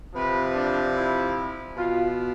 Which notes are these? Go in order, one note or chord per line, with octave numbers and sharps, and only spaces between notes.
C3 F3 B4
D4
E4
B2 F4